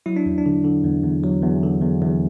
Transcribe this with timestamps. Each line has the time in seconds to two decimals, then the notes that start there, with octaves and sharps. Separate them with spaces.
0.06 F#3 E4
0.16 D4
0.26 E2
0.38 D4
0.46 D3
0.64 D3
0.84 E2
1.04 E2
1.23 F#3
1.43 E2
1.63 D3
1.82 E2
2.02 E2